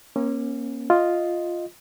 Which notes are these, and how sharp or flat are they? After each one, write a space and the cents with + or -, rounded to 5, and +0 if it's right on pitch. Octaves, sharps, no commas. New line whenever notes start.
A#3 +25 C#4 -20
F4 +0 D#5 +0